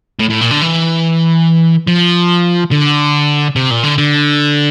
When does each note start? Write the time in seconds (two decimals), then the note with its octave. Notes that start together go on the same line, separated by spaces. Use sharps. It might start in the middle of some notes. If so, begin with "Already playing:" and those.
0.20 A2
0.30 A2
0.41 A#2
0.51 D3
0.62 E3
1.87 F3
2.71 D3
3.56 C3
3.71 A#2
3.84 D3
3.98 D3